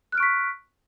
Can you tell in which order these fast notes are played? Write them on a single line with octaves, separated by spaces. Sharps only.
F#6 F6 D7 C#6 B6